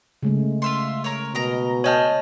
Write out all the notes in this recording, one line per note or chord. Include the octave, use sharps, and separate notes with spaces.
C#3 G#3 A3
F4 E5 C6
A#4 C#5
B2 A#4 D#5 A#5
G#4 C#5 D#5 G5 A5 F6